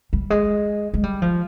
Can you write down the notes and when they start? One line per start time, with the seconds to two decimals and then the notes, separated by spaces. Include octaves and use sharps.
0.13 G3
0.30 G#3
0.94 G#3
1.04 G3
1.22 F3